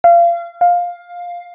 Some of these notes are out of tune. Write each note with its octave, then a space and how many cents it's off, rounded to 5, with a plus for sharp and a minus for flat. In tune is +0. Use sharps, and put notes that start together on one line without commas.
F5 -30
F5 +10